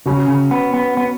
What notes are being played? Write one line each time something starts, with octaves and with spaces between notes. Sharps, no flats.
C#3 F#3 C#4 F#4
C#3
B3
B3
B3